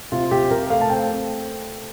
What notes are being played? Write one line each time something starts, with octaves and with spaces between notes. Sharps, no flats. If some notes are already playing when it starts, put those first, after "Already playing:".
C3 F4
C3 G4
C3 A#4
A3 F5
A5
C4 G5
C4